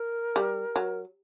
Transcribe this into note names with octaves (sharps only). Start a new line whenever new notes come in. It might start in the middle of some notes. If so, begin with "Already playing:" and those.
Already playing: A#4
G3
F#3